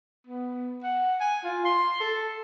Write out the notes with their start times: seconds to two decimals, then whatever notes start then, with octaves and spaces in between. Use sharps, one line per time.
0.27 B3
0.83 F#5
1.20 G#5
1.44 F4
1.65 C6
2.00 A4